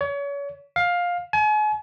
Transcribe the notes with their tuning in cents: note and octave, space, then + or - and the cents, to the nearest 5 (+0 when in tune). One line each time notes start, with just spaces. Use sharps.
C#5 +35
F5 +15
G#5 +40